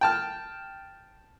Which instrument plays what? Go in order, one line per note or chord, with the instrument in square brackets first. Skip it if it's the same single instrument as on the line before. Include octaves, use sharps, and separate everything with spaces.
[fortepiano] G5 A5 F6